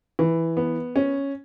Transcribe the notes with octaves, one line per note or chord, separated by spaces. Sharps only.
E3
B3
C#4